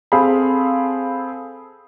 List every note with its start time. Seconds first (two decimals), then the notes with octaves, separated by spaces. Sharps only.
0.12 C4 G#4 A4 F5 B5